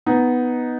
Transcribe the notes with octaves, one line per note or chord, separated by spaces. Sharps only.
B3 D#4